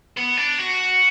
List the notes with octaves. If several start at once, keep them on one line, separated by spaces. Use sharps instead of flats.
B3
D4
F#4